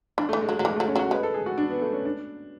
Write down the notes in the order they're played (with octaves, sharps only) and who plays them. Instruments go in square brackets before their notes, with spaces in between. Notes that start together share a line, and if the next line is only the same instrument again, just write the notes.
[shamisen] E3 [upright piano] D4
[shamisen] E3 [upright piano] A3
[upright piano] G#3
[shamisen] F#3
[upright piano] G#3
[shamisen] F#3
[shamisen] E3 [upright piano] G#3
[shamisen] F#3 [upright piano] A3
[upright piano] C#4
[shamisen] F#3
[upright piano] F#4
[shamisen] G#3 [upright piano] B4
[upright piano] A4
G#4
F#4
D4
B3
A3
C#4
D4